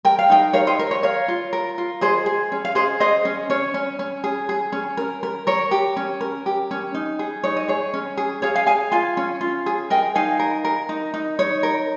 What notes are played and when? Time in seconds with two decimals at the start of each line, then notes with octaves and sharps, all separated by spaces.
0.05 A#4 G5
0.19 F5
0.30 D#4 D#5 G5
0.53 A#4 C#5 F5
0.67 C5 D#5
0.79 A#4
0.91 C#5
1.03 A#4 C#5 F5
1.28 F4
1.53 A#4
1.78 F4
2.01 G#4 C5 D#5
2.26 G#4
2.52 C#4
2.65 F5
2.75 G#4 C5 D#5
3.00 G#4 C5 D#5
3.25 C#4
3.50 C#4 C#5
3.74 C#4
3.99 C#4
4.24 G#4
4.49 G#4
4.72 C#4
4.97 A#4
5.23 A#4
5.47 A#4 C#5
5.71 G4
5.97 C#4
6.21 A#4
6.46 G4
6.71 C#4
6.95 D#4
7.19 G#4
7.44 D#4 C#5
7.57 D#5
7.68 G#4 C#5
7.94 C#4
8.17 G#4
8.42 G#4 C#5 F5
8.55 F5 G#5
8.67 G#4 F5 G#5
8.92 F4 F5 G#5
9.17 C#4
9.41 F4
9.66 G#4
9.90 A#4 D#5 G5
10.15 D#4 F5 G#5
10.39 A#4
10.65 A#4
10.89 D#4
11.14 D#4
11.39 D#4 C#5
11.63 A#4